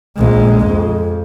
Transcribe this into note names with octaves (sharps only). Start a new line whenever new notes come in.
A#1 G#3
F2